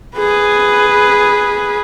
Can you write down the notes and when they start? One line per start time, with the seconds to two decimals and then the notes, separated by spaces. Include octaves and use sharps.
0.17 G#4 B4